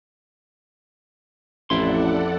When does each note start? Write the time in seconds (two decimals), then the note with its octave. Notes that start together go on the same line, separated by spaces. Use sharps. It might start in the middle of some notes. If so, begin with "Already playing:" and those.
1.70 A1 F2 E4 A4 D5 F#5 C6